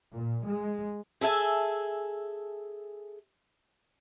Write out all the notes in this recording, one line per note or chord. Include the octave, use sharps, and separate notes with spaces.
A#2
G#3
G#4 A4 E5 G#5